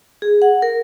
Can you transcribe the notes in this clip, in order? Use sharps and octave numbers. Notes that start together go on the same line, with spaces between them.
G#4
F#5
A#4